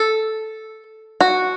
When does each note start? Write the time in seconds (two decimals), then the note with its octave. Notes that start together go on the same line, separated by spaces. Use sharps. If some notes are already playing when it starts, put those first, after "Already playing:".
Already playing: A4
1.21 F#4